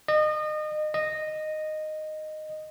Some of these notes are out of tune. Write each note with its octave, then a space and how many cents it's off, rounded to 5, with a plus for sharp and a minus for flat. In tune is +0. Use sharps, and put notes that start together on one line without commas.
D#5 -30
D#5 -10